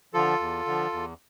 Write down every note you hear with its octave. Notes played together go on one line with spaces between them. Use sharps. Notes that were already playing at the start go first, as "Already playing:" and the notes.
D3 F3 F4 A4
E2
D3 F3
E2